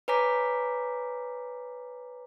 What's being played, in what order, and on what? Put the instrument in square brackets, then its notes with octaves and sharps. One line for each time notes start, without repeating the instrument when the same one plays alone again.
[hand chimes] B4 C#5 G#5 A#5 D6 B6